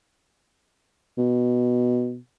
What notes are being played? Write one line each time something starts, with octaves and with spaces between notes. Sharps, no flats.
B2